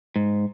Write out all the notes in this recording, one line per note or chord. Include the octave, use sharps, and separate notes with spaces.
G#2